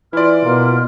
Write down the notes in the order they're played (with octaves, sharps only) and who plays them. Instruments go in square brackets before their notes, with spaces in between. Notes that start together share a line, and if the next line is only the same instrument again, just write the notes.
[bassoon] E3 [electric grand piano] E4 D5 [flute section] F4 C6 F6
[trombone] B2 [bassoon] A#3